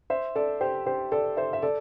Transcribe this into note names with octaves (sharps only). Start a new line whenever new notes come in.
C5 E5
A4 D5
G4 C5
G4 C5
A4 D5
C5 E5
E5
A4 D5